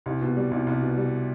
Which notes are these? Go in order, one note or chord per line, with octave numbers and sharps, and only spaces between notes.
C2
B2
G3
C2
C2
B2
G3